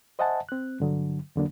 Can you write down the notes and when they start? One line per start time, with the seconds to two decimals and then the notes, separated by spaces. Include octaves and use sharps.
0.19 C5 D#5 E5 F#5 G#5 A5
0.49 C4 F#6
0.80 G2 D3 F#3
1.36 E2 D3 F#3 A#3 D4